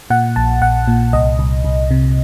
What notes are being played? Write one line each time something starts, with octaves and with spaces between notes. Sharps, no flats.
A#2 F#5
A#1 A5
A#1 F#5
A#2
C2 D#5
C2
C2
C3